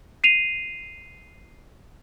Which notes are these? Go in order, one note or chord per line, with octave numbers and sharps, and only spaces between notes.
C7 D#7 F7